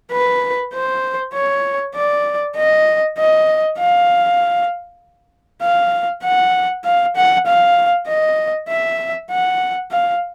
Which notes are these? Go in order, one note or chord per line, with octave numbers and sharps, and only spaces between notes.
B4
C5
C#5
D5
D#5
D#5
F5
F5
F#5
F5
F#5
F5
D#5
E5
F#5
F5